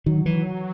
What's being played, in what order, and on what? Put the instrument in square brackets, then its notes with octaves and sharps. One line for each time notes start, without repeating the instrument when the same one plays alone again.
[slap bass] D#3 [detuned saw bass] F#3
[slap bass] E3